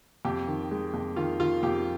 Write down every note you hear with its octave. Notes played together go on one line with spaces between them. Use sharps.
F2 G4
D#3
G#3
F2
D#3 F4
D#3 F4
F2 G4